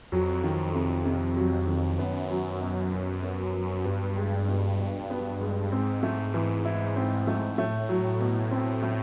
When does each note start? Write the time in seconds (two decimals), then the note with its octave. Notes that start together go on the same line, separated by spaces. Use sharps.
0.12 F2 F#3
0.44 D#3
0.74 C3
1.05 C3
1.36 F#3
1.68 D#3
1.99 F#2 B3
2.30 F#3
2.61 B2
2.92 B2
3.23 B3
3.54 F#3
3.85 G2 B3
4.17 G#3
4.47 B2
4.79 B2
5.10 B3
5.41 G#3
5.72 G#2 C4
6.03 A3
6.34 E3
6.65 E4
6.96 C4
7.27 A3
7.58 A2 A3
7.89 F#3
8.21 B2
8.51 C4
8.82 A3